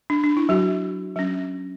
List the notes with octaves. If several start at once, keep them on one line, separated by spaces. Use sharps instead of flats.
D4
D4
E4
F#3 F#4
F#3 C#4